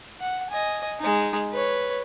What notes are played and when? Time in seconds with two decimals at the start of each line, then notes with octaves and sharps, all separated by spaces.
0.20 F#5
0.50 D#5 G#5
1.01 G#3 D#4
1.52 B4 C#5